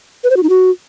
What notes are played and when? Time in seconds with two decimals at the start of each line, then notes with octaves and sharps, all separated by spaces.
0.24 B4
0.30 C5
0.37 F#4
0.43 D#4
0.50 F#4